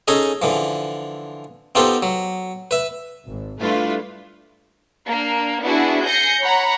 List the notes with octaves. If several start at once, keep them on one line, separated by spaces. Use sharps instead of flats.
C#4 D#4 G#4 A4 D#5
D3 E3 F3
B3 D#4 F4 G4 A4 C5
F#3
B4 E5
G#1
G3 A3 D4 E4 F4 B4
A#3 D4
B3 D4 E4 F#4 G#4
G#5 G6 A#6 C7 C#7
C#5 F#5 A#5 B5